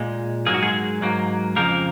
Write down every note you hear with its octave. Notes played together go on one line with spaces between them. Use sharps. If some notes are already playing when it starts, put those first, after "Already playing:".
Already playing: A#2 G#3
G#2 F#3 A#3 G#4
F#4
G#3 G#4
G#2 F#3 A#3
F2 C#3 F3 A#3 A#4